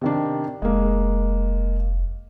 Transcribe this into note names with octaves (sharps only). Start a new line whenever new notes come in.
C3 D#3 D4
F1 G#3 A#3